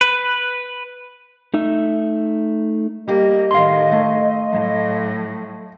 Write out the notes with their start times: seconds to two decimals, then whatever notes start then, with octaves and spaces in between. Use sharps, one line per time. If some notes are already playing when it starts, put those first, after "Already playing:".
0.01 B4
1.54 A3 D#4 E5
3.08 G3 A#3 G4 D#5
3.51 A2 D#3 F5 C6
3.92 A3
4.52 A2 F#3